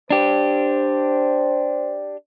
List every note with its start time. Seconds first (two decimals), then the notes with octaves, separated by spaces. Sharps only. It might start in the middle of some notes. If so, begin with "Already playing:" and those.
0.10 D4 G4 C5